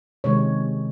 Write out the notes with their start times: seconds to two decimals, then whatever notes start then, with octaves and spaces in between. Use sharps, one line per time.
0.24 C3 D#3 G#3 C#5